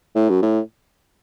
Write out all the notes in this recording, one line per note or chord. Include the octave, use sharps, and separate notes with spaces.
A2
F#2
A2